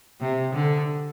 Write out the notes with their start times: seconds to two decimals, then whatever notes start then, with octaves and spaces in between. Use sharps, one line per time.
0.21 C3
0.55 D3